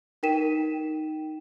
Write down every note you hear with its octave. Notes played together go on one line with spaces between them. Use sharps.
D#4 A#4 G5 B6 D#7 E7